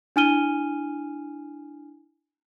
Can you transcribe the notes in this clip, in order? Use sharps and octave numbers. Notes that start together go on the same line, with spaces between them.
D4 E4 G#5 F6 D#7 G7